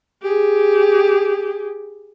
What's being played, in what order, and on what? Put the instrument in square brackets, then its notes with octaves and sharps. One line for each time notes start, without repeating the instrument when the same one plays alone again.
[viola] G4 G#4